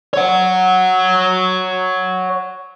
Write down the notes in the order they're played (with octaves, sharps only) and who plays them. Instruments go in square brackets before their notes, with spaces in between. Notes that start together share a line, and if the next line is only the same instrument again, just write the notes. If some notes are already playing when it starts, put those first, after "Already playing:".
[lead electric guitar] C#5 F#5